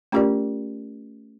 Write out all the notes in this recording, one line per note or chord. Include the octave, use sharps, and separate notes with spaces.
A3 C#4 F4 G4 A#4 D5